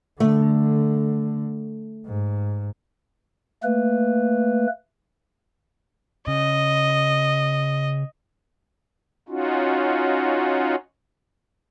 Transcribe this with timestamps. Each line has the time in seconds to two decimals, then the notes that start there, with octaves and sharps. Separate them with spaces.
0.20 D3 A3
2.06 G#2
3.63 A3 A#3 B4
6.28 C#3 D#5
9.28 C#4 D#4 F4 F#4